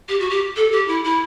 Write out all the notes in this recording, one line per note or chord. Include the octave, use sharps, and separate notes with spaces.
G4
F#4
G4
A4
G4
E4
E4